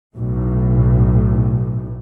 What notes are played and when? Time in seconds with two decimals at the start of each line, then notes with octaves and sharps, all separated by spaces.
0.13 B1 A2